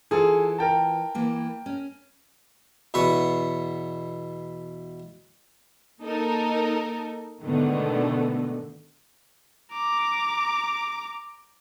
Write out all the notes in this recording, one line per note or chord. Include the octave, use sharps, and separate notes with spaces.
E3 F4 G#4 A4
A#4 G5 A5
E3 A#3
C#4
E2 B2 B4 C#6
A#3 D#4 A4 A#4
G#2 B2 D3 D#3 A3 B3
A#5 D6